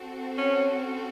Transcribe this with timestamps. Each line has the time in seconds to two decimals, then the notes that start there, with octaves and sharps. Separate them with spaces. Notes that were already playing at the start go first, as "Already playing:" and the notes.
Already playing: C4 F#4 A4
0.38 C#4